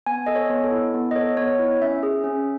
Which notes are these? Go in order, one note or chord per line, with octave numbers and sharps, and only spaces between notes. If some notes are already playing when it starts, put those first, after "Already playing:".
B3 G#5
A4 D#5
C#5
B3
A4
E4
B3
D#5
A4 C#5
B3 C#5
E4
C#4 E5
G#4
C#4